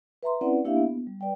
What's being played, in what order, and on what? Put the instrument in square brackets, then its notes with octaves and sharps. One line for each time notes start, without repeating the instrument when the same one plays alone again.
[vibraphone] B4 E5 A#5 C6
C4 C#4 E4 B4 D5 F#5
A#3 D4 E4 G4 E5 F5
B3
G3
B4 D5 G5